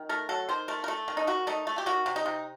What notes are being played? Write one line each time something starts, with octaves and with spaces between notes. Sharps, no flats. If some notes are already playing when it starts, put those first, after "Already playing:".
Already playing: D#3
A3 A#4
F#3 A4
D#3 C5
A3 A#4
A#4
A3 A4
D#3
D#4
D#3 F#4
A3 D#4
A3
G4
D#3 F#4
C3
D#4
C3